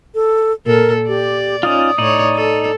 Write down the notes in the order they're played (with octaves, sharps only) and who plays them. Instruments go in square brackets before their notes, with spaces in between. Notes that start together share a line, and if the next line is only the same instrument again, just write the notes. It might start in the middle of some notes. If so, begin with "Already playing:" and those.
[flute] A4
[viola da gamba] A#2 A4 [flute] A#4
[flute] G4 [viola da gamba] D5
[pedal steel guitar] C#4 D#4 F4 [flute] D#6
[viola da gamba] A2 C#5 [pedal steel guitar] D#4 D5
[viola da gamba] A4